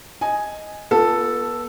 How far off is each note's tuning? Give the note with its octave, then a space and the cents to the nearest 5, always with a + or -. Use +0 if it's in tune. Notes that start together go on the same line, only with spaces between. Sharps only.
D#5 +0 G#5 +0
B3 -35 F4 +0 A4 +0